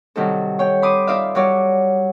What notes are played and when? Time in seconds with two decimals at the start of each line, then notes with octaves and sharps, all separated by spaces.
0.16 C3 D#3 F#3 G3 D#4 A4
0.59 C#5 G5
0.82 B5 C6 D6 D#6
1.07 D#4 F4 D5 E5 F5
1.35 F#3 G3 C#5 D5